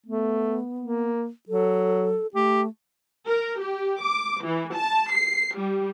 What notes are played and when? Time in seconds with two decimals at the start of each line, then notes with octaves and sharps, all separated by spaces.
0.06 A3 B3
0.80 A#3
1.49 F#3 A4
2.34 A3 G4
3.26 A#4
3.60 G4
4.02 D6
4.42 E3
4.74 A5
5.14 C7
5.56 G3